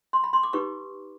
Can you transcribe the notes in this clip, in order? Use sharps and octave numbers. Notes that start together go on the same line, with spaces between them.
C6
B5
C6
D6
D#4 G4 B4 C#6